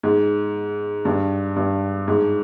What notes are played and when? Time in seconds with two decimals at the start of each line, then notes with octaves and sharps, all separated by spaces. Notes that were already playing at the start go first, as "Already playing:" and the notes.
0.03 G#2
1.05 G2
1.56 G2
2.08 G#2